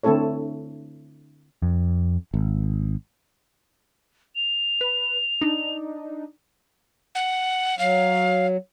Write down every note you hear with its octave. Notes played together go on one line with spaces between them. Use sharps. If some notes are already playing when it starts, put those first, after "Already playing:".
D3 A3 C4 E4 A4 C#5
F2
G#1
F7
B4
D4 D#4
F#5
F#3 F5